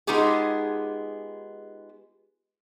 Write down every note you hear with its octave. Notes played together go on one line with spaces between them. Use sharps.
G#3 B3 D#4 F4 G4 G#4